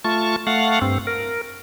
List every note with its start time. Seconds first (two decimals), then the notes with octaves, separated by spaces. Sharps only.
0.04 A3 F4 A5 C#6
0.47 A3 F5 F#5
0.82 G2 C4
1.07 A#4